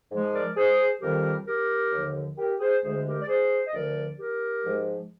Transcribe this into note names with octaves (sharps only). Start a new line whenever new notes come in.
G#2 F3 G#3
A#4 D5
G#4 C5
F2 D#3 G3 G4 A#4
G4 A#4
D#2 D3 F3
G4 A#4
G#4 C5
D2 D3 G#3 G#4 C5
G4 A#4
D5
G#4 C5
D#5
D2 D3 F3 A#4 D5
G4 A#4
G#2 F3 G#3